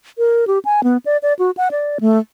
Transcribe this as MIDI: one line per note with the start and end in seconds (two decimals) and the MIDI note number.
0.18 0.45 70
0.47 0.59 67
0.65 0.83 80
0.84 0.97 59
1.06 1.17 74
1.22 1.33 74
1.39 1.51 66
1.57 1.69 78
1.71 1.98 74
2.01 2.19 57